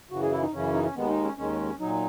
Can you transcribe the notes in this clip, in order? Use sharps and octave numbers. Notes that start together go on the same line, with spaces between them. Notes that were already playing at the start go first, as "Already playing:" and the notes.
F#2 C#3 E3 F#4
G#4
E4
D#4
F#2 C#3 E3 C#4
D#4
C#4
D#2 D#3 G#3 B3
D#4
C#4
D#2 D#3 G#3 C#4
A#2 F#3 D#4